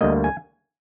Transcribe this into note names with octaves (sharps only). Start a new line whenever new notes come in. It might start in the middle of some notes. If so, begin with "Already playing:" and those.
D2 D3 G3 A#3 D#5
G#5